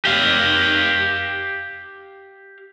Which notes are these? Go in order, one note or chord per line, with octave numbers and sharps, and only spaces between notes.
G4 F5